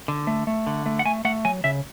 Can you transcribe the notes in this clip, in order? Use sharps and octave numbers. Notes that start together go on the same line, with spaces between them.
D3
A3
A3
D3
A3
F#5
A3 G#5
A3 F#5
F#3 G#5
C#3 E5